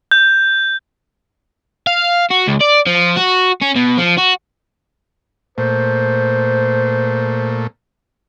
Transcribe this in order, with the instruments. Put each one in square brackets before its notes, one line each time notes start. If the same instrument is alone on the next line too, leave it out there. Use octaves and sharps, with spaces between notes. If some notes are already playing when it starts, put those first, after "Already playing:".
[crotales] G6
[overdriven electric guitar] F5
F#4
C#2
D5
F3
F#4
C#4
B2
F3
F#4
[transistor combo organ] A#2 A3 [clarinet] C5